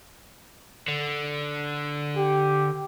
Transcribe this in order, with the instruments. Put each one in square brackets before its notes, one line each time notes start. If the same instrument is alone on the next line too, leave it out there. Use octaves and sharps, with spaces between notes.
[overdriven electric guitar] D3
[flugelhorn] G4